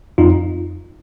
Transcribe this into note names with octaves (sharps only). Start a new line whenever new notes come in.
F2 D#4 F4